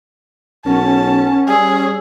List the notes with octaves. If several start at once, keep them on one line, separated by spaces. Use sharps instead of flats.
B1 C#4 A#4 F#5 A5
G3 G#4 D5 G#5 E6